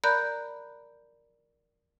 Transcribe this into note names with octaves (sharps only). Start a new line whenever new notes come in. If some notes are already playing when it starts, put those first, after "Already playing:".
A#4 D5 A#5 B5 F#6 G6